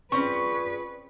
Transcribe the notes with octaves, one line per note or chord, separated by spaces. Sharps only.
C4 C#4 F4 G#4 B4 D5 C#6